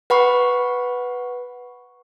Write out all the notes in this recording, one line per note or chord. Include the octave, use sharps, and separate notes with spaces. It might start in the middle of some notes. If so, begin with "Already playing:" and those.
B4 F#5 B5 C#6